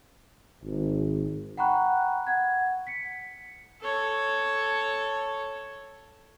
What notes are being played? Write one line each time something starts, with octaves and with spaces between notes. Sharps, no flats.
G#1
F#5 G5 A#5 B5 C#6 F#6
F#5 G#6
B6 C#7
A4 C#5